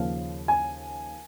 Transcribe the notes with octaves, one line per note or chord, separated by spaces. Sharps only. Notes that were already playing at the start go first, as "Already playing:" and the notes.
Already playing: D#2 C#3 F3 A#3 C#4 F5
G#5